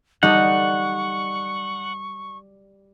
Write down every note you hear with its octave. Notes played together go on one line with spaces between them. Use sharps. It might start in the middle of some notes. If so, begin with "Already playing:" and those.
G3 D#4 A4 F#5 C#6